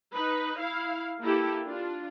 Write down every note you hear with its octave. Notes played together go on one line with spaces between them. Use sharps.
D#4 B4
E4 F5
A#3 E4 G4 A4
D4 F4